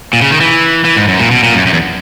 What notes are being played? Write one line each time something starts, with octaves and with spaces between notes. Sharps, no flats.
A#2
C#3
D#3
E3
E3
G#2
F#2
A#2
B2
A#2
F#2
F#2
E2